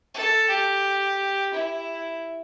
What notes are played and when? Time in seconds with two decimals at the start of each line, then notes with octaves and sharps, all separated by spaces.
0.14 A4
0.50 G4
1.54 E4